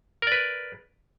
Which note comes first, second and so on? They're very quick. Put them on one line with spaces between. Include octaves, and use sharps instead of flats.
A#4 D5 B4